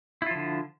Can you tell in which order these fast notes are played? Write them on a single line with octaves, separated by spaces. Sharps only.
E4 F4 F3 D3